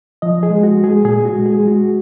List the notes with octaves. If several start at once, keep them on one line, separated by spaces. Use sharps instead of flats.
F3 D#5
G#4
G#3
F#4
G#3
G#4
A#2 G#4
F#4
G#3
G#4
G#3
F#4